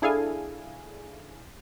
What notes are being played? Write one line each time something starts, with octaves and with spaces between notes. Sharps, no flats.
D4 E4 G#4 A4 F5 G#5